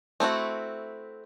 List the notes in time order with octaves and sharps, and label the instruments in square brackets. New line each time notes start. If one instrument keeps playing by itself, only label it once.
[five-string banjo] A3 C4 E4 F#4